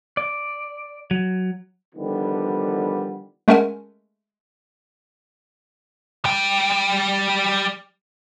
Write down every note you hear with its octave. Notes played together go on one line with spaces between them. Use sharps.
D5
F#3
D3 D#3 F3 G3 B3
G#3 A3 C#4 A#4 F#5 G#5
G3 G5